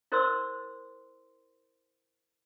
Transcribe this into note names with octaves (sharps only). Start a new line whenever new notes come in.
E4 A#4 C5 D5 C6 E6